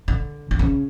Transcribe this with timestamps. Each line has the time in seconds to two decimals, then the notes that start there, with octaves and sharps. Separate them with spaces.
0.08 D3
0.51 D3
0.59 C#3